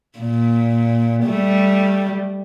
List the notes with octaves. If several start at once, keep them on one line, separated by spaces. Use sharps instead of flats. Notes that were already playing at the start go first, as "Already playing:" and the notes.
A#2
G3 A3